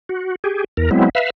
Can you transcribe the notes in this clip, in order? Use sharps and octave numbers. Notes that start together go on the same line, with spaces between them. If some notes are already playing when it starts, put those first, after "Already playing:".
F#4
G4 G#4
E2 A#4
F#3 G#3 B3 C4 E4
B4 E5 F5